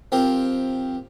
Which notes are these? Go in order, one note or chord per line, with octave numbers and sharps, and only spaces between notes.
F3 C4 G4 A#4